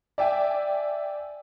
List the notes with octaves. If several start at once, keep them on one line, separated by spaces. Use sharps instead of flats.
D5 E5 G5 G#5